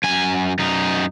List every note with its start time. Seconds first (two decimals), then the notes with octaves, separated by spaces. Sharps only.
0.04 F#2 G#5
0.59 F#2 D#4